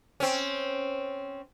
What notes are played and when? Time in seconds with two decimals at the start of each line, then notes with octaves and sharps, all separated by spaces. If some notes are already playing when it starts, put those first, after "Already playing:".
0.20 C4 C#4